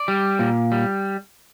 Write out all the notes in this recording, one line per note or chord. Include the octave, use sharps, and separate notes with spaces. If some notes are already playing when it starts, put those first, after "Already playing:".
Already playing: D5
G3
A#2
G3